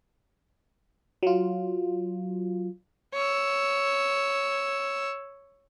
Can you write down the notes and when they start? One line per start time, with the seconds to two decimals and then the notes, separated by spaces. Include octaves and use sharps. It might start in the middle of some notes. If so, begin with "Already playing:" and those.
1.23 F#3 F4
3.14 C#5 E6